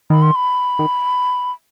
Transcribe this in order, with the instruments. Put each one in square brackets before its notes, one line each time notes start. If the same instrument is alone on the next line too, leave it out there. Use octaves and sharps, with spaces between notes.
[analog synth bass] D#3 [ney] B5
[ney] C6
B5
[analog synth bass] D#3